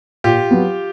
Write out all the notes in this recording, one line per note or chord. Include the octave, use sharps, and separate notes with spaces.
A#2 F4 G4
F#3 B3